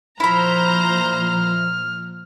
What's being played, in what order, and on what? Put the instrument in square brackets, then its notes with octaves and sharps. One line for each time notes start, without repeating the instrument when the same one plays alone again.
[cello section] A#2 F3 [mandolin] E4 B5 [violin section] C5 A#5 [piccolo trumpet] F6